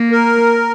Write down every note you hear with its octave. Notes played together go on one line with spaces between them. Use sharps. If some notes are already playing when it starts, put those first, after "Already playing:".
Already playing: A#3
A#4